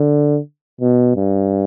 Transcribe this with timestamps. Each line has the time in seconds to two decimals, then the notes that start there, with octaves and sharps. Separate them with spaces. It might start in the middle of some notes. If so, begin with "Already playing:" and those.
Already playing: D3
0.81 B2
1.16 G2